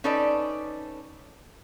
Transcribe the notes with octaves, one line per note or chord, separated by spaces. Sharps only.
C#4 D#4 A4 B4 D5